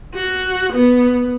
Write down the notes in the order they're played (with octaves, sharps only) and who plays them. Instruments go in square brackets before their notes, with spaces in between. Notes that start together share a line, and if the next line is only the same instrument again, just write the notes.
[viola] F#4
B3